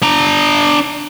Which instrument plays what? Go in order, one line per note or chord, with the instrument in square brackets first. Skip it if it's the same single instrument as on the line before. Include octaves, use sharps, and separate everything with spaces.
[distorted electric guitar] D4 A#5